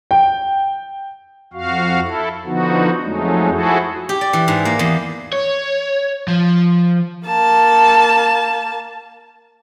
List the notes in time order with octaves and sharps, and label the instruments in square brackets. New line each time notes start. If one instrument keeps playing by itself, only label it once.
[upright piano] G5
[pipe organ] F2 F#4 F5
E4 A4
D3 F3 B3 D#4 F#4
F2 F#3 G#3 A3 D#4
F3 E4 F#4 G#4 A4
[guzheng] G4
D5
E3
G#2
A#3
E2
[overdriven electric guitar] C#5
F3
[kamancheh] A#3 A5